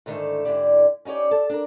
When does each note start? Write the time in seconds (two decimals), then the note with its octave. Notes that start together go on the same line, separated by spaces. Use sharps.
0.06 G#2 D3 D#3 A3 E4 A4
0.45 G#2 D3 E4 G4 D5
1.05 C#4 D#4 G4 C#5 D5
1.31 A4
1.50 D4 A#4